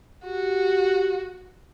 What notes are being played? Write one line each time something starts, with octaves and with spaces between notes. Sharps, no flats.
F#4 G4